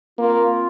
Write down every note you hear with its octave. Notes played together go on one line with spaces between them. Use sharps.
A#3 C4 F4